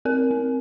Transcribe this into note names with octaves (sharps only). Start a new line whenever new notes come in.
C4 A#4
C4